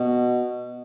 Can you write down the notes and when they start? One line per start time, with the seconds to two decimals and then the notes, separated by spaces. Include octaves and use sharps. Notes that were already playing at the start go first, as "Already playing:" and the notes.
Already playing: B2